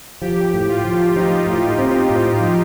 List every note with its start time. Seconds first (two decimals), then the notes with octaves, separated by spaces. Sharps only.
0.22 F3 G4
0.54 A2
0.69 F4
0.84 F3
1.16 F3 D#4
1.47 A2
1.79 C4
2.10 A2
2.40 F3